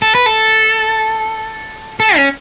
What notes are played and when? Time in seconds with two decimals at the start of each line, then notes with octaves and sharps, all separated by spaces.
0.02 A4
0.15 B4
0.26 A4
2.00 A4
2.16 C#4